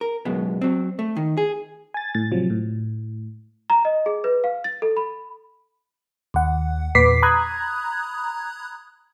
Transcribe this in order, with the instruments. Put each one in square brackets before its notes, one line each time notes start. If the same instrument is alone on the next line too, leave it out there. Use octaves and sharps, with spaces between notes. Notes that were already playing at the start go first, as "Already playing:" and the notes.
[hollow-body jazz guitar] A#4
C#2 F#2 B2 G#3 B3
F#3 C4
A3
D#3
G#4
[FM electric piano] G#5 A6
A2 A6
C3 F3 F#3
A2
[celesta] A#5
D#5
G#4
B4
F5
A6
A4
B5
[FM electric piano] D#2 F#5
E2 A#2 B4 D6 B6 C7
A#5 B5 D#6 F#6 G#6